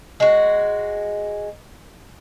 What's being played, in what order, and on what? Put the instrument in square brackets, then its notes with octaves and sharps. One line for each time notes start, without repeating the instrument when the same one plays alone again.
[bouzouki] G#3 F#4